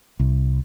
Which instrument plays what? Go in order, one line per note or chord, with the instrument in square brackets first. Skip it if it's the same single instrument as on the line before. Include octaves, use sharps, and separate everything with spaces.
[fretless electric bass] C2